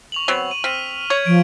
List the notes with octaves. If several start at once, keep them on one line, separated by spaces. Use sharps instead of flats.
C#6 F7 F#7
F#3 B3 C4
D#7
C4 F6 B6 D#7
C#5 G#6
F3 D7